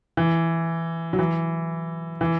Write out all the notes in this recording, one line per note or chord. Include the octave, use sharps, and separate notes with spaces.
E3
F#3
E3
E3